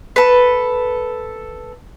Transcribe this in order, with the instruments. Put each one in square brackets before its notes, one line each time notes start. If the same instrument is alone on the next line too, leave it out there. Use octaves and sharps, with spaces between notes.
[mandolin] A4 B4